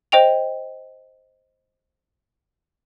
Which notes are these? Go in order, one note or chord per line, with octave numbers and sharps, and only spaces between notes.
C5 D#5 G5 F7